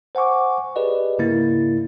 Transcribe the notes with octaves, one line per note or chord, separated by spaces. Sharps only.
C5 F#5 G#5 C#6 D6
G4 G#4 B4 D5 D#5
G#2 C#3 A#3 E4 A6